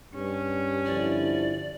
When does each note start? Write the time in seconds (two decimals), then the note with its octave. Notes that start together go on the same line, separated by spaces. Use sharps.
0.14 G2 C#4
0.86 D3 F3 E4 D5